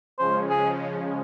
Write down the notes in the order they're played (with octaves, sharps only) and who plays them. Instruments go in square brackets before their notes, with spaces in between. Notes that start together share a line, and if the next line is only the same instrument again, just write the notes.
[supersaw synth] C#3 F3 G#3 C#4 [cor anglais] C5
[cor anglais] G#4